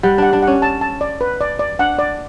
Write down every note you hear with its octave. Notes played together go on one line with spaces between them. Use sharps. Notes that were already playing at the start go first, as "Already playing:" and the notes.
G3 F#5
D4 F#5
D4
C#4 F#5
A5
A5
D5
B4
D5
D5
D4 F#5
D5